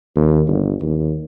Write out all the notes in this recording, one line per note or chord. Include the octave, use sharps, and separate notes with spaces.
D#2
G1
D#2